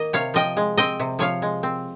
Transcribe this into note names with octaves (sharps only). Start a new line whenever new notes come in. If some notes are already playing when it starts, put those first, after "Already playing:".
Already playing: D#3 A#3 D#5
C3 C#5 F5
F3 D#5 G5
G#3
C4 D#5 G5
C3
F3 C#5 F5
G#3
C4